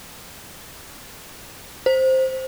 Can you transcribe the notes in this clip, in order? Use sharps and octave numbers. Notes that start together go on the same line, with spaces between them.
C5